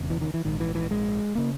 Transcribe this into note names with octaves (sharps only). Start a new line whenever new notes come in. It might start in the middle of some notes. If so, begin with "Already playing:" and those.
Already playing: E1 E2 C#3
E3
D#3
E3
A#1 G#2 D#3
E3
E3
G#3
C#3 A#3